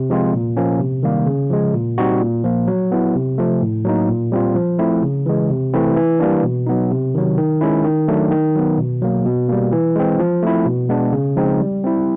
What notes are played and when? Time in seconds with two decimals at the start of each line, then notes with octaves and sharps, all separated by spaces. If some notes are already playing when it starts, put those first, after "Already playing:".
Already playing: C3
0.10 F3 G#3 C4 F4
0.33 A#2
0.57 F3 A#3 C#4
0.80 C3
1.03 D#3 G3 A#3
1.26 C#3
1.50 F3 G#3
1.74 A#2
1.98 G3 C4 D#4 F#4
2.21 A#2
2.44 F3 A#3
2.67 F#3
2.92 B3 E4
3.15 C3
3.38 F3 A3
3.61 A2
3.85 F#3 A#3 D#4
4.09 A#2
4.32 G3 C4 F4
4.55 F3
4.79 A3 C4 E4
5.02 C#3
5.26 E3 G#3
5.50 C3
5.74 E3 A3 C4 E4
5.96 E3
6.19 G3 A#3 D4
6.43 B2
6.66 F#3 B3 D#4
6.91 C3
7.15 D#3 F#3
7.38 D#3
7.61 G#3 C#4 E4
7.84 D#3
8.08 F#3 A3 D4
8.31 D#3
8.55 F#3 B3
8.78 B2
9.02 F#3 A#3
9.25 B2
9.48 G3 A#3
9.72 E3
9.96 G#3 C4
10.19 F3
10.43 A3 C4 E4
10.66 B2
10.89 G#3 B3 D4
11.13 C#3
11.36 F3 G#3 C4 D#4
11.60 G3
11.84 C4 E4